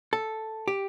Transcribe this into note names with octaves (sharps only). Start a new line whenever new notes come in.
A4
G4